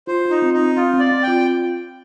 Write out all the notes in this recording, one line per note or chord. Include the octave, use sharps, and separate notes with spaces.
F4 C5
D#4 F4
C4
D#4
C4
C4 F4
C4
D5
C4
G5
F4